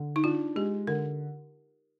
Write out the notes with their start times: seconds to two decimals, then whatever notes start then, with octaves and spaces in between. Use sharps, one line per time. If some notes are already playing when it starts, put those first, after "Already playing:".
Already playing: D3
0.16 D#4
0.24 D4 F4
0.56 G#3 G4
0.87 D3 A#4